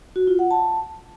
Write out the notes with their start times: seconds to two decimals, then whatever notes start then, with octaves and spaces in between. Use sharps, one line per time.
0.16 F#4
0.27 F4
0.39 F#5
0.51 A5